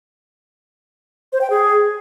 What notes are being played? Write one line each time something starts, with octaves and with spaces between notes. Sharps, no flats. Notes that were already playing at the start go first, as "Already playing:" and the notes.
C5
G5
G#4